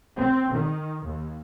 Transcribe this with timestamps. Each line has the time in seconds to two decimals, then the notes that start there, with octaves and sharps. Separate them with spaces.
0.16 C4
0.52 D#3
1.05 D#2